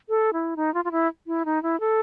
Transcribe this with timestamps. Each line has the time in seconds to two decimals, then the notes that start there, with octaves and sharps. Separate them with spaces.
0.09 A4
0.33 E4
0.56 D#4
0.74 F4
0.85 F4
0.92 E4
1.27 E4
1.45 D#4
1.63 E4
1.80 A4